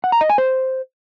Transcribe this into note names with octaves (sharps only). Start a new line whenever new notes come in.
F#5
A#5
D#5
G#5
C5